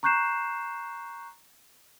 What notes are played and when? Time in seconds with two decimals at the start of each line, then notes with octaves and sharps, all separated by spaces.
0.03 A#5 C#6 F#6 G6 C7 E7